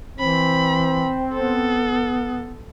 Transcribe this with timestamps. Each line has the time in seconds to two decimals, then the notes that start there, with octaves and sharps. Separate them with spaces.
0.19 E3 C4 B5
1.34 B3 A4